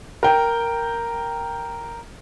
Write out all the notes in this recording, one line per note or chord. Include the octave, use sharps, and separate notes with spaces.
A#4 G5